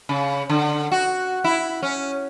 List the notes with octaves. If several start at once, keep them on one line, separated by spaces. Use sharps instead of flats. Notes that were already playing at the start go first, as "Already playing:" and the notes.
C#3
D3
F#4
E4
C#4